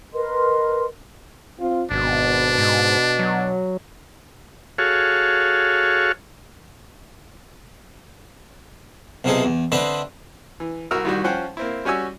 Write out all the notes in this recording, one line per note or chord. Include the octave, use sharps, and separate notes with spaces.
A#4 B4 D#5 C6
C4 F4
G#1 B2 D4
G#2
F#3
F#4 G#4 A4 C#5 F5
B1 C3 F3 D#4 G#4 A4
E2
D3 C4 D4 B4 D#5 E5
E3
C2 F#4 A#4 E6 F6
C2 D#3 G3 F#4
F3 C#4 C5 F#5 G5
A#3 C4 E4
G3 C#4 F#4 G#5 E6